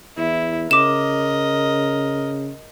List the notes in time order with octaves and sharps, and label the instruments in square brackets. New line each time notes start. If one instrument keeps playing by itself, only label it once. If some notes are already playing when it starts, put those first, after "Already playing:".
[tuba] E2 [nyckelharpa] E4
[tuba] C#3 [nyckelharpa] A#4 D#5 [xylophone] D6 E7